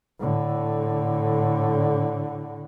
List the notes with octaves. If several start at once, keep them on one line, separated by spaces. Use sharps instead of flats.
A2 D3